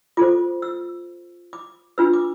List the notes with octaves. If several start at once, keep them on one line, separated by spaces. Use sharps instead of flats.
F4 A4 C5 D6
E6
D6
D4 F4 B4 E6
D6